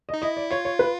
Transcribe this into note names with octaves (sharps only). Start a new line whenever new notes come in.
D#5
D#4
E4 D#5
D5
F4 C#5
C#5
B4